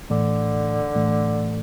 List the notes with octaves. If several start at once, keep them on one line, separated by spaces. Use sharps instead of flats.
A2 D3 E3 A3
A2 E3 A3